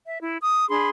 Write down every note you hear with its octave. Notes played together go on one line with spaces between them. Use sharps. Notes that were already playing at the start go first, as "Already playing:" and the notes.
E5
E4
D#6
D4 G#4 B5 C6